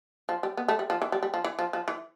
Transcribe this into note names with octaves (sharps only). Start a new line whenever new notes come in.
F3
G3
B3
A3
G3
F3
E3
G3
G3
F3
E3
F3
F3
E3